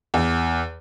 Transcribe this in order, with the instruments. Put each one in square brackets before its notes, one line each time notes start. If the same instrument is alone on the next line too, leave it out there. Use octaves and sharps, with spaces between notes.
[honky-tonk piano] E2